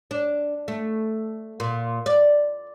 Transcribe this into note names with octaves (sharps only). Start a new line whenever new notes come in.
D4
A3
A#2
D5